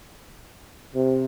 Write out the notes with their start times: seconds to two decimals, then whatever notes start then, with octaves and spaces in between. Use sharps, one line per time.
0.95 C3